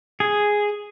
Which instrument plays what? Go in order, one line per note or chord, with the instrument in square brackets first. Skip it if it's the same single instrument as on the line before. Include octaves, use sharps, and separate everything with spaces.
[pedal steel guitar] G#4